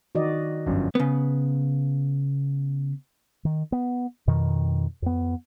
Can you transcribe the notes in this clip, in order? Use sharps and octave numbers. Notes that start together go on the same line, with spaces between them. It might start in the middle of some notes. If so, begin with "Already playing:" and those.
D#3 F#4 D5 D#5
G1 F#2 F3
C#3 B3
D#3
B3
F2 B2 D#3
F2 B3